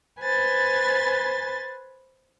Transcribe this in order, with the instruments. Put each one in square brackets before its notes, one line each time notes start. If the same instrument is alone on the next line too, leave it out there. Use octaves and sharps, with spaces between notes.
[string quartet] B4 C5 G#5 A6